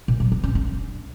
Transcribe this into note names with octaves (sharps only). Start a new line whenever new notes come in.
A#2
F#3
B3
C#4
D4